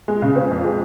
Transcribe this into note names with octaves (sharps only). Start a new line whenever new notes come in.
G#3
C#3
C4
F2
G#3